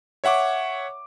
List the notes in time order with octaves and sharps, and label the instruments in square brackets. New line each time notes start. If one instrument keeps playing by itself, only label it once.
[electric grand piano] C#5 E5 F#5 C#6 D6